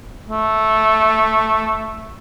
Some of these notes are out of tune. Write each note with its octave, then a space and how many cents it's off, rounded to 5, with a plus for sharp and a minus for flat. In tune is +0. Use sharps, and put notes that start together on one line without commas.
A3 -5